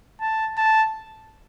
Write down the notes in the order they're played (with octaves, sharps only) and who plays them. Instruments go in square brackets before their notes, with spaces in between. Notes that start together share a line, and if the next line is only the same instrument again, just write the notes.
[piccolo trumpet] A5
A5